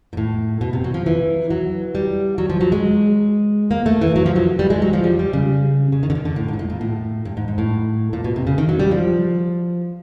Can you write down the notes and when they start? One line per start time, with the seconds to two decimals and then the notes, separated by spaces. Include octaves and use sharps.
0.13 A#2
0.17 A2
0.61 B2
0.73 C3
0.84 F#3
0.94 F3
1.06 E3
1.50 F#3
1.95 G3
2.38 F#3
2.50 F3
2.61 F#3
2.72 G#3
3.71 A#3
3.86 A3
4.01 E3
4.16 F#3
4.26 F3
4.36 F#3
4.59 G3
4.70 G#3
4.82 F#3
4.93 F3
5.04 G3
5.19 G3
5.33 C#3
5.92 C#3
6.03 D#3
6.10 D3
6.15 D#3
6.25 D3
6.36 A2
6.48 G#2
6.53 A#2
6.59 A2
6.70 A#2
6.81 A2
7.25 G2
7.37 G#2
7.48 G#2
7.58 A2
8.13 A#2
8.24 B2
8.36 C3
8.47 C#3
8.58 D#3
8.69 F#3
8.80 G3
8.91 F3